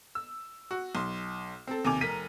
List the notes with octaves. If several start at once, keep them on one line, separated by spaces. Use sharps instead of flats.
E6
F#4
B1 C6
C4 A4
D#2 C3 G#5 D6 F7
F1 A#4 A#5 B6 D#7